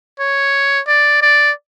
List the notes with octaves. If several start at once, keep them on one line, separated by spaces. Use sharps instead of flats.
C#5
D5
D5